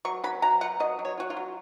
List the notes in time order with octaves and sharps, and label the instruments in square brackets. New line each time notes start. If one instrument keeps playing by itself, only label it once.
[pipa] F#3 C#6
F#3 B5
F#3 A#5
F4 F#5
F#3 D#5
F#3
C#5
F4 F#4
F4
F#3